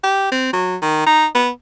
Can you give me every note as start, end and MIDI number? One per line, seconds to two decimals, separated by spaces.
0.04 0.29 67
0.32 0.52 60
0.53 0.77 54
0.82 1.06 51
1.07 1.26 63
1.35 1.50 59